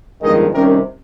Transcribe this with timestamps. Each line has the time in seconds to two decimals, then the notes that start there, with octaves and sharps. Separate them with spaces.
0.22 G1 F2 D#3 G#3 D#5
0.53 C2 C3 D#3 G3 C#4 A#4